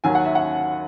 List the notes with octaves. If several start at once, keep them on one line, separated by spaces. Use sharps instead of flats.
D#2 D#3 F#3 G#5
F#5
E5
F#5